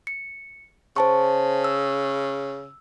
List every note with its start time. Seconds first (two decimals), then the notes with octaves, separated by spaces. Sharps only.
0.07 C#7
0.96 C#3 C5 A5 C#6
1.64 E6